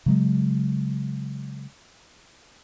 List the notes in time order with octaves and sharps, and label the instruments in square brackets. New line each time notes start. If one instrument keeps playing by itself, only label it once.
[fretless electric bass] C#3 F#3 G#3